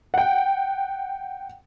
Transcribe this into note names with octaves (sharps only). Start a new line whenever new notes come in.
F#5 G5